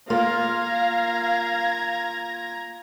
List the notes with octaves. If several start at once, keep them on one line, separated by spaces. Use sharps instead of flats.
A#3 F4 F5 A#5 G#6